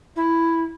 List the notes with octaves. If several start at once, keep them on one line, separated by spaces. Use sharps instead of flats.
E4